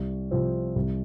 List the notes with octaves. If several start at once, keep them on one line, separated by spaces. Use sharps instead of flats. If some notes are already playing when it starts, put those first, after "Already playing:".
Already playing: C2
C3 F3 C4
C2